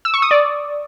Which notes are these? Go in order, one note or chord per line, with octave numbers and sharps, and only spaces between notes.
E6
C#6
D#6
D5